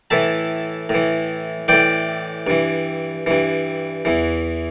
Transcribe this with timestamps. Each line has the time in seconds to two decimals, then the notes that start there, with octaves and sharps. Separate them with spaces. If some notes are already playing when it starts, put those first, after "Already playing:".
0.10 A2 E3 E5 A5
0.89 A2 E3
1.68 A2 E3 D5 G5
2.47 G2 E3
3.26 G2 E3
4.05 E2 E3